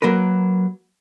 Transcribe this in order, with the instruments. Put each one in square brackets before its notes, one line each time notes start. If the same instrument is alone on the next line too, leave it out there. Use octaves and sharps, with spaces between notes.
[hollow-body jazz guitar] F#3 A#3 A#4 B4